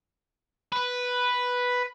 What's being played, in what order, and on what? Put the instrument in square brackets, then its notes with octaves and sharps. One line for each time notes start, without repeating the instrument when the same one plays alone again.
[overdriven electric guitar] B4